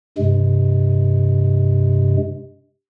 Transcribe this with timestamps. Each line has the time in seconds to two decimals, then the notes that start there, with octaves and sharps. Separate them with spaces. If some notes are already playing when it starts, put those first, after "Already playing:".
0.18 G2 C3 G#3